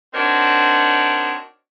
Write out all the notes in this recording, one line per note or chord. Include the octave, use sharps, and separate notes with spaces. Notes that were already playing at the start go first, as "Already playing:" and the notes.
C4 D4 D#4 F#4 A#4 C#5